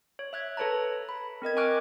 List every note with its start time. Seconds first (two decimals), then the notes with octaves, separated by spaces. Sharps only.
0.19 C#5
0.33 E5 F#6 G#6
0.57 A4 B4 C#5 A5 A#5
1.09 B5
1.42 C4 A#4 D#5 G#6
1.57 G#5 C#6 D6 F6 F#6 D7